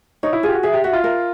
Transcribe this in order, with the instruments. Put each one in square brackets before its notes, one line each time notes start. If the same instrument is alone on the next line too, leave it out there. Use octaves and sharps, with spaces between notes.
[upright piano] D#4 [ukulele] C#5
[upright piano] E4
[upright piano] F4 [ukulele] G#4
[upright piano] G4
F#4
[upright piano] G#4 [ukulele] E5
[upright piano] G4
[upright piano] F#4 [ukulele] E5
[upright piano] F4
[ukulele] A#4